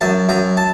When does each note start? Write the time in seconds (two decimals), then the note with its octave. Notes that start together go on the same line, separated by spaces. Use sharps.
0.01 F#2 A5
0.29 F#2 A#5
0.57 A5